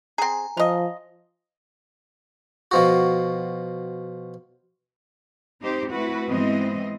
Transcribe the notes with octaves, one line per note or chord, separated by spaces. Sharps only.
C4 G#4 G#5 A#5
F3 F4 D#5
B2 F3 F#4
C4 D#4 G4 C5
A3 C4 E4 F#4 B4
G#2 E3 B3 C4 D#5